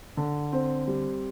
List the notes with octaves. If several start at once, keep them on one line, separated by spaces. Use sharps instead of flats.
D3
C4
G3